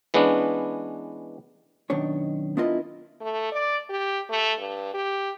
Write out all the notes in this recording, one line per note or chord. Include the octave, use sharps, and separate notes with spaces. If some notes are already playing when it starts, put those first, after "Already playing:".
E3 G#3 B3 C#4 D4
F#2 B2 D#3 D4 C#5
B3 D4 E4 F4 A#4 D#5
A3
D5
G4
A3
G2
G4